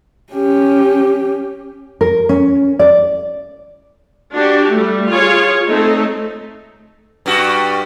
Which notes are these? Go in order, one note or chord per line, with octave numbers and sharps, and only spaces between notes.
C#4 G4
A#4
C#4
D5
D4 F#4 G4
G3 A3
F4 G#4 C#5
A3 C4 D#4 A4
G2 G3 F#4